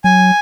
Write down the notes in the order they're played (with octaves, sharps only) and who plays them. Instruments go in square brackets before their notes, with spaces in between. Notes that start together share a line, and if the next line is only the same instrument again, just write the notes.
[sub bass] F#3 [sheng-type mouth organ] G#5